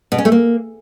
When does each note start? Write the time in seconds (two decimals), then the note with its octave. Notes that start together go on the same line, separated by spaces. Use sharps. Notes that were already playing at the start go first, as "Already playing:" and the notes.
0.12 B2
0.18 C#4
0.25 A3
0.32 A#3